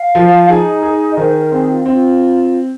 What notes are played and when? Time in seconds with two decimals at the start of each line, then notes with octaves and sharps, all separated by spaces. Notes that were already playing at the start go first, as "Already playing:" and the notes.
Already playing: F5
0.15 F3
0.49 D#4 G#4
0.83 G#4
1.10 D#5
1.17 D#3 C5
1.35 A#4
1.51 C4 G#4
1.69 F4
1.85 C4 F4